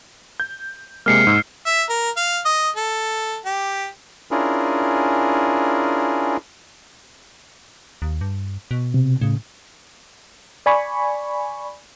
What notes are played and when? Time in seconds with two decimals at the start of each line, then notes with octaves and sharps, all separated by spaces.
0.40 G6
1.06 C3 G#3 A#3 F6 C7 C#7
1.27 G#2 E6
1.66 E5
1.90 A#4
2.17 F5
2.45 D#5
2.77 A4
3.45 G4
4.31 C#4 D4 E4 F4 G#4 A#4
8.02 D#2
8.21 G2
8.71 B2
8.94 C3
9.22 A2 C#3
10.66 D5 G#5 B5 C#6